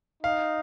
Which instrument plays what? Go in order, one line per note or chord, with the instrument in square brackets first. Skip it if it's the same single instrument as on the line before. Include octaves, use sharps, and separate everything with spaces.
[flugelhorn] D#4 [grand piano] F5